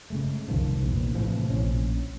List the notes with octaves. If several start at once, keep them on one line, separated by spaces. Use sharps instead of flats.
C#3 G#3 A3
F1 C2 D#3 F3
A#1 E2
A2 C3 E3 F3
A#1 C#4